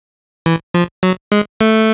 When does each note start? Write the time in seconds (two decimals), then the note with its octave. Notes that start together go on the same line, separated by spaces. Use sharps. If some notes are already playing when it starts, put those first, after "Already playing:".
0.46 E3
0.74 F3
1.03 F#3
1.32 G#3
1.61 A3